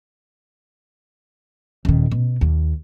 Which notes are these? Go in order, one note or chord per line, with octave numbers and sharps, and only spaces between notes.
D#1 D#3
B2
D#2